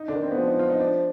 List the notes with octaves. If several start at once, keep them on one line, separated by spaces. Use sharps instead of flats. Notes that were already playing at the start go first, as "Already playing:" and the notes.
Already playing: D#4
D3 D4
D#3
C4
B3
F3 G#3
D#4
F4
D#4
D4